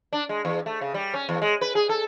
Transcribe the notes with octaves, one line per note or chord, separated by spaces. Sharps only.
D4
G#3
E2
A3
C#3
G3
C#4
E2
G#3
B4
G#4
A4